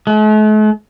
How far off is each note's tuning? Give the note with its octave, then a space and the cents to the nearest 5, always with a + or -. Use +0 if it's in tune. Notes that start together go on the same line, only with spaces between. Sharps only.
A3 -45